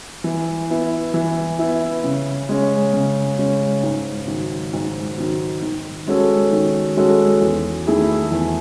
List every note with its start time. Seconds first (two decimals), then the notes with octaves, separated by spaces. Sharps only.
0.24 E3
0.69 B3 E4
1.14 E3
1.59 B3 E4
2.04 C#3
2.49 G#3 C#4
2.93 C#3
3.38 G#3 C#4
3.83 G#2
4.28 D#3 F#3
4.73 G#2
5.17 D#3 F#3
5.62 D#3
6.07 G#3 C#4 F#4 A4
6.53 D#3
6.97 G#3 C#4 F#4 A4
7.42 E2
7.87 D#3 A3 E4 G#4
8.31 E2